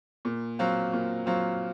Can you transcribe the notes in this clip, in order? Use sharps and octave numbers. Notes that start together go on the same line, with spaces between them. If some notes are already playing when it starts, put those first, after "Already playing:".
A#2
F#3 C4 F4
A#2
F#3 C4 F4